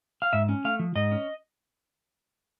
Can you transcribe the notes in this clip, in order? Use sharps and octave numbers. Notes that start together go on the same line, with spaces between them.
F5
G#2 E5
C#4
A3 F5
F3
G#2 D#5
C#4